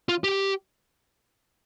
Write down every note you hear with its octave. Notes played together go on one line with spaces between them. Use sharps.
F4
G4